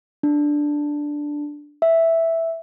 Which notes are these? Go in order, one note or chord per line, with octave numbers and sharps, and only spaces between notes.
D4
E5